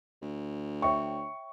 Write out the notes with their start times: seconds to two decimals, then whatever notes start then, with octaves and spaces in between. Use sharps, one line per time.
0.22 D2
0.82 C#5 E5 G5 C#6